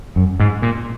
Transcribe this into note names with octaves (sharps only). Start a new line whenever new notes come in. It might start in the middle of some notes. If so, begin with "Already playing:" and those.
F#2
G#2
A#2